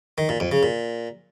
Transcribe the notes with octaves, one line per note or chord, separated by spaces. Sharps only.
D#3
A#2
F2
C#3
A#2